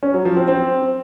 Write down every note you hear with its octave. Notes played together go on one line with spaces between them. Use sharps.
C#4
F#3
F3
C4
C4